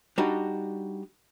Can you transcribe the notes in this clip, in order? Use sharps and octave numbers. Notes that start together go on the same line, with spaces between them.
G3 D4 D#4 F#4